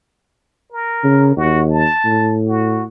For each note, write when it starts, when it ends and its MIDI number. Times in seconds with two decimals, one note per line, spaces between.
0.73 1.34 70
1.04 1.35 49
1.37 1.86 39
1.37 1.65 66
1.71 2.37 81
2.05 2.86 45
2.48 2.83 66